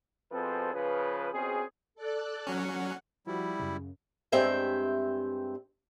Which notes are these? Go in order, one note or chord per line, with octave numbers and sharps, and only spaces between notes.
B2 F3 C4 G#4 A4 B4
C#3 F3 B4
F2 B2 C4 C#4 G#4
A4 D5 F#6
F#3 C#4 F#5
F3 G3 E4 F#4
F#2 C#3
G2 G#3 C4 E5 G5